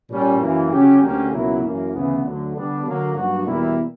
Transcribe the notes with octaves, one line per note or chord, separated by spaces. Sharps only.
A#2 G3 C#4
F#2 E3 A#3
C#3 F#3 C#4 G4
D2 D3 A#3 C#4 G4
C#2 B2 F#3 A#3 E4
F#2 E3 A#3
D2 C#3 E3 B3
D2 D3 F#3
D3 G3 B3 D4
D3 F#3 A#3
G2 F#3 A#3 D4 F#4
E2 B2 G3 A#3 E4